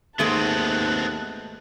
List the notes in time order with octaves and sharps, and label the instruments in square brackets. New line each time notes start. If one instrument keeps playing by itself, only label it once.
[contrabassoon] D#2 [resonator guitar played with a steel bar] G#2 G#3 A3 [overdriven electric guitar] B3 C4 [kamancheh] A5 F#6